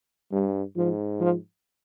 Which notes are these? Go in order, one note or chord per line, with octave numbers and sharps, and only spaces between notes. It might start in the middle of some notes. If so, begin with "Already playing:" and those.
G2 G3
G#2 F3
F3